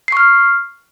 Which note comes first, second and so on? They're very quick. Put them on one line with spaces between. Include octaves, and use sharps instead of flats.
C7 C#6 F6